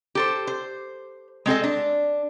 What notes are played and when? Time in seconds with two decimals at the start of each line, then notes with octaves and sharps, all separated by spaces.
0.15 G4 A4 C5
0.47 C5
1.46 G#3 C4 A4 D#5
1.64 D4